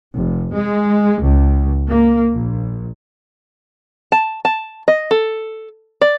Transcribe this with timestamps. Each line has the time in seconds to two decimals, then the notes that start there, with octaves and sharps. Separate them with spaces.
0.16 F1
0.55 G#3
1.24 C#2
1.89 A#3
2.33 A#1
4.12 A5
4.45 A5
4.88 D#5
5.11 A4
6.01 D5